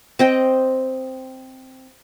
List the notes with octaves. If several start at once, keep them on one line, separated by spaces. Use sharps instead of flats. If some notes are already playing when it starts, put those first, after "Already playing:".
C4 D#5 G5